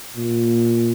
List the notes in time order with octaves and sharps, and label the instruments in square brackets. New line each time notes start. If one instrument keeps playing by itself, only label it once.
[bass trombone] A#2